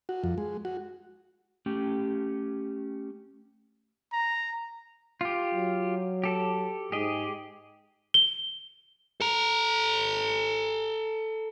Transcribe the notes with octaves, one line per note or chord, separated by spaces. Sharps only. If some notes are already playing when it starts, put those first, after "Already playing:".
F#4
F2
G#3
F#4
A3 C#4 G4
A#5
F4 G4
F#3
G4 A4
G#2 G4 G#4 D#5
G7
A4 A#5